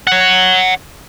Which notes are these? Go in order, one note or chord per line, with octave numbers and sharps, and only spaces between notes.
C#5 F#5